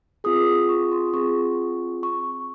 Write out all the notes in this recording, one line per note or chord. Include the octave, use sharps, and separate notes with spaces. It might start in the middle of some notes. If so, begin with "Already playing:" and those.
C4 F4 G#4 D#6
D#6
C#6
C6
C4 F4 G#4 C#6
C#6